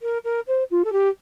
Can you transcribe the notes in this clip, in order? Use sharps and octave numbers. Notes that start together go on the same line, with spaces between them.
A#4
A#4
C5
F4
A4
G4